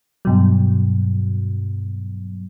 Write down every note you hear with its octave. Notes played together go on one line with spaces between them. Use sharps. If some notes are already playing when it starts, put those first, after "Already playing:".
G2 B2 F#3